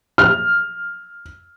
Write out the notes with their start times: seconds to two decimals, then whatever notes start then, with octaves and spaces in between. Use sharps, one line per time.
0.18 F6